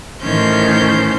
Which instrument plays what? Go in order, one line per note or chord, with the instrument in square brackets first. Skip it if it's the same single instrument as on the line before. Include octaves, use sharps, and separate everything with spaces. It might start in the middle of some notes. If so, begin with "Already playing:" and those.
[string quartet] A2 D#3 E3 C#4 C5 G6